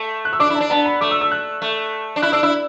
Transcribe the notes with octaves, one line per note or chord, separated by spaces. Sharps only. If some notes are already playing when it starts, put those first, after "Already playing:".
Already playing: A3
F#6
E6
D4 D6
E4
A5
D4
B3 A5
B5
A3 D6
E6
E6
F#6
A3
D4
E4 F#6
D4 E6
E4 E6